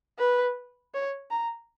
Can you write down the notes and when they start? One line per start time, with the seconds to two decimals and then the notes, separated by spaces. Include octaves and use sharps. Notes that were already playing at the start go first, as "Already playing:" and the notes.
0.18 B4
0.94 C#5
1.31 A#5